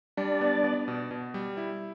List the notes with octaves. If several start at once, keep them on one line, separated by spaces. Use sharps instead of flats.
G3 D4 D5
B3
B3
B2
B2
G3
E4